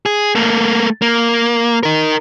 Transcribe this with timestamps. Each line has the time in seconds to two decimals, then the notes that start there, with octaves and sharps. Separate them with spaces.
0.06 G#4
0.35 A3 A#3
1.02 A#3
1.83 D#4 A#4